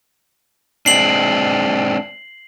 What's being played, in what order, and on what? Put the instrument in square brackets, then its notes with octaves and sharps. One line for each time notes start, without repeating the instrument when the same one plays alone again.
[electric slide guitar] G#3 C4 D4 [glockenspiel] C7 F#7